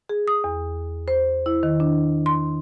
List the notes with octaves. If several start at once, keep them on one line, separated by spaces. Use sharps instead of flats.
G#4
D#6
E2
C5
E4
D#3
D4
C6